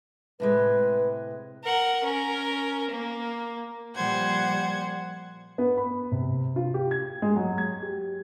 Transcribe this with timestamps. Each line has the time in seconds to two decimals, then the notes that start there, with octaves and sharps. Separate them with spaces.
0.40 A2 C3 G#3 B4
1.64 A#4 F#5
2.04 C#4 A#4
2.90 A#3
3.94 A#2 F3 G3 C5 F#5 G#6
5.58 B3
5.77 B5
6.12 C3
6.56 F4
6.74 G4
6.91 G#6
7.22 G#3
7.36 F#3
7.58 G#6
7.83 G4